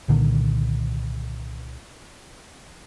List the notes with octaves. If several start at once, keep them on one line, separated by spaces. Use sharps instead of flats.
C2 A#2 D3 D#3